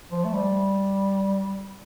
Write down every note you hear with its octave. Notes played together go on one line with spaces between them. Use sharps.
F3
A3
G3